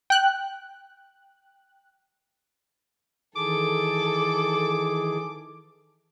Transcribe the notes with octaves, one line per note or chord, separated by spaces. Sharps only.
G5 F#6
D#3 E3 G#4 A4 D6